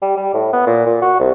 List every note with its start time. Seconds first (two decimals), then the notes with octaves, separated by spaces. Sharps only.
0.02 G3
0.17 G3
0.34 A2
0.53 B3
0.67 A#2
0.86 A#2
1.02 F#4
1.19 C2